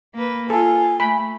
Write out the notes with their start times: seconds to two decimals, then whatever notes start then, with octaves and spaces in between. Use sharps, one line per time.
0.15 A#3 B4
0.50 F4 A4 G#5
1.00 A3 B5